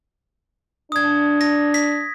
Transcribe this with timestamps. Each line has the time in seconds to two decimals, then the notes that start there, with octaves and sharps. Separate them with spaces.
0.92 D4 D#6 G#6
1.41 A#6
1.74 B6